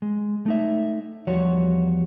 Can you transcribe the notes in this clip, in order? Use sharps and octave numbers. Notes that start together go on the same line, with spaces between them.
G#3
A3 D#4 E5
E2 F3 G3 F#4 C#5